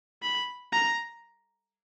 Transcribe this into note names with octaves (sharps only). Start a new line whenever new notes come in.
B5
A#5